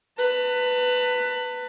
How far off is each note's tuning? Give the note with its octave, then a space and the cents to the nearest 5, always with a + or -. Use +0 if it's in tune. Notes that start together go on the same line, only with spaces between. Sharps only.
B4 +10 A5 +45